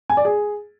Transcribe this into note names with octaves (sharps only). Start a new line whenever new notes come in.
G#5
D5
G#4